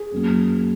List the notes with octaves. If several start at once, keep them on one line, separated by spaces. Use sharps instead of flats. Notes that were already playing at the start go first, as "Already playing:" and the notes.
Already playing: G#4
F#2 F#3 A#3